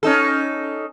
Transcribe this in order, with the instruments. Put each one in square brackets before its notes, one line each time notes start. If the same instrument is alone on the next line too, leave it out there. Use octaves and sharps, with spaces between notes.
[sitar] C#4 D#4 A4